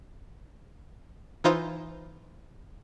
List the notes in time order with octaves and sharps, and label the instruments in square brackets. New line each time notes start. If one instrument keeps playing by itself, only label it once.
[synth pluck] E3 D#4 F4 C5